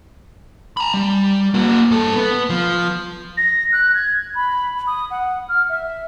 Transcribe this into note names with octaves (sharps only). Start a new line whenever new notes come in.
A#5 B5
G3
A#3 F#4
G2 A4
B3
F3
A#6
F#6
G#6
B5
D#6
F#5
F6
E5